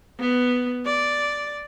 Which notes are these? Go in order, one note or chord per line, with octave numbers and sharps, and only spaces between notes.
B3
D5